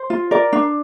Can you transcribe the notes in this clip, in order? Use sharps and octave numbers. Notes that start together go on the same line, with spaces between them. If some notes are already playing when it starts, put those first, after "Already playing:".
Already playing: C5
F4
A#4 D5
D4